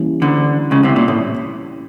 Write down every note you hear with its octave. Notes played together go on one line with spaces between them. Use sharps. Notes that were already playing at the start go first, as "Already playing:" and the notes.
Already playing: E3 G3 A#3 C#4
D2 D3
C#2 C#3
C2 C3
A#2
A2